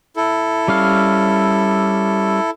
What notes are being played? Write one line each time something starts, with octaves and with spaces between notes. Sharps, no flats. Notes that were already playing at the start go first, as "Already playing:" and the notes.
E4 A4
G3 C#4 F5